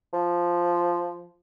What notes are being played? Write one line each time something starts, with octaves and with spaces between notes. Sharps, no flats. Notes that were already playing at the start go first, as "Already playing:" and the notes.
F3